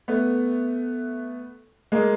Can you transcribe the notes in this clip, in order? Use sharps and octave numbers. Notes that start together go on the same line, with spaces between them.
A3 B3
G#3 A#3